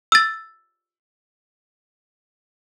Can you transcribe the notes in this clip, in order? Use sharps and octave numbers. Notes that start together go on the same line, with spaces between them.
E6 A6